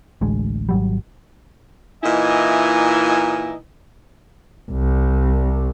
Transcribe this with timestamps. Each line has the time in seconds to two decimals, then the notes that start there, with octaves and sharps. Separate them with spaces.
0.21 A1 D2 G#3
0.69 G#1 F#3 G3
2.04 A#2 E3 D#4 E4 D#5 G#5
4.71 C2